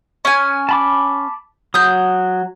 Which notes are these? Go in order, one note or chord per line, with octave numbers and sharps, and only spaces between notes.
C#4 G#5
A5 B5 D6
F#3 D#6 G6